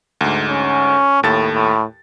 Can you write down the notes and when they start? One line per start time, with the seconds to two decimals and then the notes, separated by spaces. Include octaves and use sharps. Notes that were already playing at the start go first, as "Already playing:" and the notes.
0.21 D2 G#2
0.49 C#4
1.23 D#2 A2 A4 A6
1.54 A2